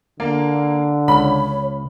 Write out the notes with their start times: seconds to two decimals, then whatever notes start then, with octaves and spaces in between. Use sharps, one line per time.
0.20 D3 A#3
1.08 C#2 C#5 B5